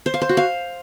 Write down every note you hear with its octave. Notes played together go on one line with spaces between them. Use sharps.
C5
F5
C5
F#4
F5